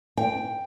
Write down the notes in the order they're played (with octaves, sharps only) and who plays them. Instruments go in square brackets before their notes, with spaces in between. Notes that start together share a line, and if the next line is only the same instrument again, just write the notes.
[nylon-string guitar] G5